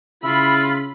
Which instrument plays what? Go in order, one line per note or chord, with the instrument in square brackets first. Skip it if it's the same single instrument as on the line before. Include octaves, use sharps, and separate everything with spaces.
[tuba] C#3 [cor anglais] E4 [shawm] F4 [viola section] B5